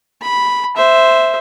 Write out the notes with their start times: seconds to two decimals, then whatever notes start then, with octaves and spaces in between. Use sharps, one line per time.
0.22 B5
0.77 C5 E5